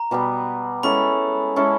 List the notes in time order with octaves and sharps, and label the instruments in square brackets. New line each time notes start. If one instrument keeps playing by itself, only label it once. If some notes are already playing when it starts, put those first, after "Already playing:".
Already playing: [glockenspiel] A#5
[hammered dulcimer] B2 G3 B3
[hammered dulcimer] G#3 C#4 E4 A4 [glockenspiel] B5
[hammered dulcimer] G#3 C#4 E4 A4